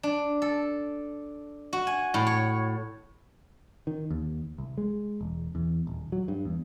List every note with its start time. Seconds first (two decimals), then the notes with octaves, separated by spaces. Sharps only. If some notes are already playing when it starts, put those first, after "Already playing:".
0.03 D4
0.42 A4
1.73 F#4
1.87 G#5
2.14 A2
2.27 C#5
3.87 D#3
4.10 D#2
4.58 C2
4.78 G#3
5.21 E1
5.55 E2
5.87 D#1
6.12 F#3
6.28 G2
6.45 E2